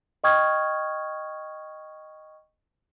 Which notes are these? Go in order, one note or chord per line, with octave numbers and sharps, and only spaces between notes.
D#5 G5 C#6 D#6 F6 G#6